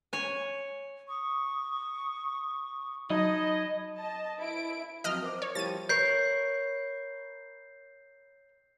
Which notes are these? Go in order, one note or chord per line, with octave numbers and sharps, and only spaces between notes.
C#5 G#5
C#6 D#6
F#3 D#4 D#5 A5 B5 G#6
D#5 A5
E4 D7
F3 F#3 C4 D#5 F6
A#4 C5 D6
C#5
F3 G3 E4 A6 D#7
A#4 B4 C#5 G6 C7